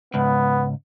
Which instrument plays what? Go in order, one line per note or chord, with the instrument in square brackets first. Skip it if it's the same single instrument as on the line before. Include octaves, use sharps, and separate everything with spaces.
[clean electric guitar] C#2 G#2 [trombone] B3